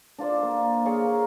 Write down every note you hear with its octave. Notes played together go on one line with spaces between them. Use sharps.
D4 F4 C5 D5
A#3
G#4 C#5 D#5 F5
A#4